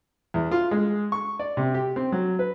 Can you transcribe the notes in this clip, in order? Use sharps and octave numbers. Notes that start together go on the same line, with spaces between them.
E2
F4
G#3
C#6
D5
C3
G4
C4
F#3
B4